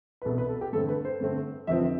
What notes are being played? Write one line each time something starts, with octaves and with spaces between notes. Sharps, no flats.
B4
C2 B2 B3 A4
B4
A4
G4
G2 D3 A3 C4 A4
B4
C5
G2 D3 A3 C4
F1 F2 D3 F3 C4 E5